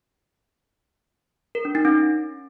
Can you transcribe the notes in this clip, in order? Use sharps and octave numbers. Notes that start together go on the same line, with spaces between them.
A#4
D4
D#4
C#4